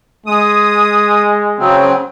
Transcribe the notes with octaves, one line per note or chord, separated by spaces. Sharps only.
G#3 D#6
C#3 F#3 C4